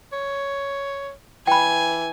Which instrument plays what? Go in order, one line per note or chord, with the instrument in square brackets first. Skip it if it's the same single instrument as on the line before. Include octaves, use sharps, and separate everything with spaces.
[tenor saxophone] C#5
[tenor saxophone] E3 [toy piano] G5 B5 [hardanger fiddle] G#5